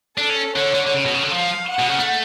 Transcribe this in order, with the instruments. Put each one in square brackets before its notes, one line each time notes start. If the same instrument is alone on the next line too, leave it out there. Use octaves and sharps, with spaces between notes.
[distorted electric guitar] D4 [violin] A4
[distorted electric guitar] C#4
[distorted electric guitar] D3 [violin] C#5
[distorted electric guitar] D3
D3
C#3
B2
C#3
D3
[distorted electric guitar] F3 [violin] F5
[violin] F#5
[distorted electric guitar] B2
C#3
A3